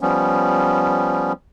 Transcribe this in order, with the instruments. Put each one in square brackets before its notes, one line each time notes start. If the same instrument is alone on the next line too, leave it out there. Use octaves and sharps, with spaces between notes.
[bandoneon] F3 G3 B3 C#4